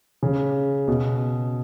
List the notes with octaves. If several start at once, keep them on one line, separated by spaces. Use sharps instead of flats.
C#3
B2